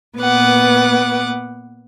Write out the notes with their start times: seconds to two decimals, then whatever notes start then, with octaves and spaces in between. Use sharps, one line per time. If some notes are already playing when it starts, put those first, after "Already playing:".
0.18 A#2 B3 B4 F#5 D6